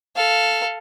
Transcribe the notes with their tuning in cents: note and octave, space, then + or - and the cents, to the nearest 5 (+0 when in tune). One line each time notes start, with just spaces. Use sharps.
A4 +0 F5 -5